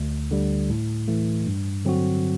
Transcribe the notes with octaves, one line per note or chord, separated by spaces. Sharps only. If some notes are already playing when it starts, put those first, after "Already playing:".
Already playing: D2
D3 G3
A2
E3 A3
G2
D3 F#3 C4 F#4